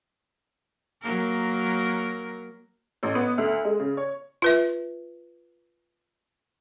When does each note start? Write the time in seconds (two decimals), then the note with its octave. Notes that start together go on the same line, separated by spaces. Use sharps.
1.02 F#3 A#3 A#4
3.03 A1
3.15 B3
3.38 D2
3.65 G#3
3.79 C#3
3.97 C#5
4.42 F4 B4 E5